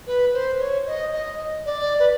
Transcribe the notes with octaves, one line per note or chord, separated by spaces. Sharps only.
B4
C5
C#5
D#5
D#5
D5
B4